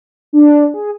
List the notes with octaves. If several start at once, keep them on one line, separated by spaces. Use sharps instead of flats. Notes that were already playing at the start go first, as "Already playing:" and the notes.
D4
G#4